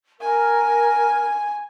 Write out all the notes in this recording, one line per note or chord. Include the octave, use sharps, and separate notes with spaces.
A#4 G#5